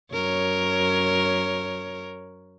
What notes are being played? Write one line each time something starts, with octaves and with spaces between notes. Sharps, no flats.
F#2 A#4 C#5